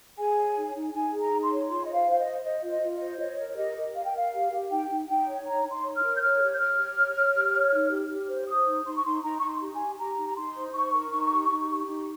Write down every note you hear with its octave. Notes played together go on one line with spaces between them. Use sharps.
G#4 G#5
C#5
D#4
D#4
D#4 G#5
G#4
A#5
D#4
C6
C#5
F4 C6
C5 D#5
F5
C5 F5
D#5
C5
C5 D#5
F4
D#5
F4
D#5
C5
C#5 D#5
A#4
C#5
G4 D#5
A#4
A#4 F5
G5
A#4 F5
G4
G4
D#4 G5
D#4
D#4 G5
C#5
D#4 A#5
D#4
C6
C#5
F6
A#4
G6
C#5 F6
G4
G6
C#5 F6
G4
C#5
C#5
G4
C#5
D#4
G4
G4
C5
C5 D#6
D#4
D#4 C6
C#6
D#4 C6
D#4 A#5
D#4 C#6
C6
G4
G#5
G4
G4 A#5
D#4
A#5
D#4 C6
C5
D#4 C#6
A#4
D#4
G4
D#4
G4
D#4